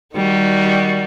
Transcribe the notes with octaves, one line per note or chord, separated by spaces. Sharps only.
D#3 G3 F#4